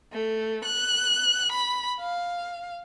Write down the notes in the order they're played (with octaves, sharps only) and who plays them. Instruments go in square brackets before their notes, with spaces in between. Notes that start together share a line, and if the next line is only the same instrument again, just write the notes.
[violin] A3
F#6
B5
F5